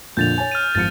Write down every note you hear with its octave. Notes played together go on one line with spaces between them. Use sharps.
F2 A#2 D3 G6 A6 F7
C#5 G#5
F6 D#7
G#1 F3 A6 C#7